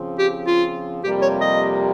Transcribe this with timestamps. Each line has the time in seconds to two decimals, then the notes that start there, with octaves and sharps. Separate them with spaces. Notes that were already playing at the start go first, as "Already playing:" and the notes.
Already playing: C#3 F3 C4
0.19 G4
0.47 F4
1.04 F2 C3 G3 A#3 G4
1.22 C#5
1.41 D#5